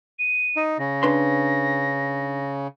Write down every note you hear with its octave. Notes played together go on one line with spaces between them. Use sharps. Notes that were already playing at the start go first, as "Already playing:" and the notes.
D#7
D#4
C#3 A#6
D4 B4 C6